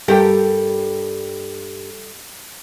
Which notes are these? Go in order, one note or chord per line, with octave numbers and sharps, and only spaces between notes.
G2 G3 G4 A4 A#4 G5